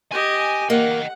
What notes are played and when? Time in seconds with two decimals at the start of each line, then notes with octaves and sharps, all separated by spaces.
0.12 G4 D#5 G#5
0.70 A#3 D#5 F#5 G5